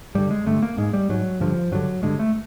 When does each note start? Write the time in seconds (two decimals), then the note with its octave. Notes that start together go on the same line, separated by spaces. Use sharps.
0.15 G2 D3 G3
0.31 G#3
0.46 G2 D3 A3
0.62 A#3
0.78 G#2 G#3
0.93 G3
1.09 G#2 F#3
1.40 G2 D3 F3
1.72 G2 D3 F#3
2.03 G2 D3 G#3
2.19 A3